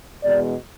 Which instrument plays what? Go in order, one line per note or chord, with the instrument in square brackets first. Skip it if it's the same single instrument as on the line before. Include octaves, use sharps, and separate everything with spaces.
[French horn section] E2 B2 G#3 D5